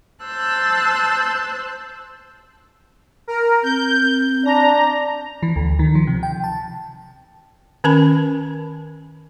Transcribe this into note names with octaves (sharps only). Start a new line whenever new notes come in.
C5 A5 E6 F#6 G6
A#4
C4 G6
D4 A#5
E3
D2
D#3
F3
C3
G5
A5
D#3 C#4 A#4 G#5 B5